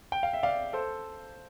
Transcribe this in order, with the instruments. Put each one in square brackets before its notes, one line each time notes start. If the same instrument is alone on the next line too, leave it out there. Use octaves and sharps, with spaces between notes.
[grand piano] G5
F5
E5
D5 F5
A4 C5